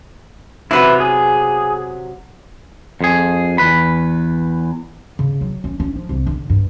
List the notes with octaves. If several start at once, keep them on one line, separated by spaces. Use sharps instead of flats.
C3 F#3 B3 E4 B4
G#4
F2 G#4
E2 G2 B4 B5
C#3
F#3
C#4
C#4
F3
C2
D3
G2